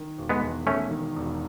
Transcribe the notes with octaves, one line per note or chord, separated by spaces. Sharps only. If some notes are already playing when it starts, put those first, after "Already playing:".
Already playing: D#3
E1
G#3 B3
E2
E1 A3 C#4
D#3
E1